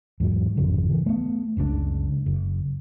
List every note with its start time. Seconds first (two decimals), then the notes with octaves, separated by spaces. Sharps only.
0.20 E2 G#2 F#3
0.57 D1 G#1 F2 C#3
0.90 E3
1.06 A3 B3
1.57 F#1 C#2 D3 D4
2.26 F#1